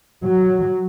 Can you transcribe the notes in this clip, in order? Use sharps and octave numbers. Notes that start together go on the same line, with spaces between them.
F#3